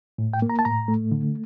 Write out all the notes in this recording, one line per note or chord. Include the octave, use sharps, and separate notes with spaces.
A2
G5
A#3
A#5
A5
A2 A#5
A3
D3